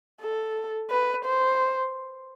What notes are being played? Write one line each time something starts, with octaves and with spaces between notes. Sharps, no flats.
A4
B4
C5